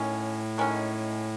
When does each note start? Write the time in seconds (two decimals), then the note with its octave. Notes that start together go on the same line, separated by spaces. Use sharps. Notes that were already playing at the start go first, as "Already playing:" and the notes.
Already playing: A2 D#3 C#4
0.58 D#3 G#3 C#4